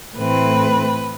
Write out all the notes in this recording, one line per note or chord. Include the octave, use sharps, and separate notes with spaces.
A2 E3 A3 C4 B4